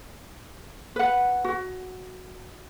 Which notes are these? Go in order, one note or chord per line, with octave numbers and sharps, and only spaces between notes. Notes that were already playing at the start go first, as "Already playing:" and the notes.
B4 F#5
F#4